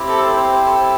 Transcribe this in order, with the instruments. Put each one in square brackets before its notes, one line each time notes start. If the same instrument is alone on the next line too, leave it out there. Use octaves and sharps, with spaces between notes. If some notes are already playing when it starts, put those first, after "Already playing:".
Already playing: [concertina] C4 E4 G4
A4
C5
C5
C5
A4